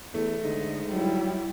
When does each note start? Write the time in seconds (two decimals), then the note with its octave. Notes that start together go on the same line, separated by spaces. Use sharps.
0.14 E2 A3
0.43 G#2 D3 D#5
0.90 F#3 G3 E4